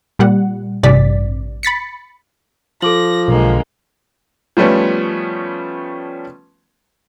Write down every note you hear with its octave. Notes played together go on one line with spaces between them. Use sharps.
A#2 G3 F#5
A1 G2 C3 D5 A6 B6
B5 A6 B6 C#7
F3 A4 D6 A#6 F#7
B1 D3 G#3 A#3
F3 G3 A3 B3 C#4